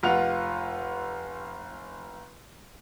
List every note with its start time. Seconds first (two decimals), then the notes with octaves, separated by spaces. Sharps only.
0.03 F1 F4 F#5 F7